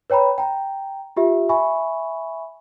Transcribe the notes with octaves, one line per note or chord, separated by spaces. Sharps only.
B4 C#5 G5 A#5 B5
G5 A#5
F4 G4 E5
E5 G#5 B5 C#6